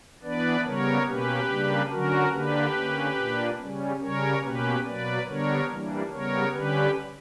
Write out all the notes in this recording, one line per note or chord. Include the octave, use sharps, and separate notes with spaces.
E3 B3 D4 B4 D5
C#3 G3 B3 A#4 C#5
B2 A#3 C#4 G4 B4
C#3 G3 A#3 D4
D3 F#3 C#4 F#4 A#4
D3 A#3 D4 G4 B4
D3 A#3 C#4
A#2 A#3 D4
C#3 G3 C#4
C#3 G3 C#4 A#4 C#5
B2 A#3 C#4 G4 B4
B2 F#3 A#3 B4 D5
D3 G3 B3 D4 A#4 C#5
E3 G3 A#3 D4
C#3 G3 B3 A#4 C#5
D3 G3 C#4 G4 B4